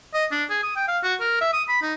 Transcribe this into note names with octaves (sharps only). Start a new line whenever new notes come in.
D#5
D4
G#4
D#6
G5
F5
F#4
A#4
E5
D#6
B5
D#4